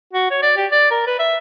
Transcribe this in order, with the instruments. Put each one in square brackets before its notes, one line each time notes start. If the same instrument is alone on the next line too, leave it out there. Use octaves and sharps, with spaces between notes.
[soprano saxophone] F#4
C#5
D5
G4
D5
A#4
B4
E5